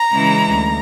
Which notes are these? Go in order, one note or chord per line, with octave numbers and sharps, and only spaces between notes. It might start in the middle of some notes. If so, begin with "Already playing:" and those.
Already playing: A#5
C#3 E3 G#3 C#4 E4
D2